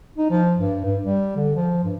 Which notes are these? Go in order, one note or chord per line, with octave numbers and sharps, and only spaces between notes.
D#4
F3
G2
G2
G3
D3
F3
G2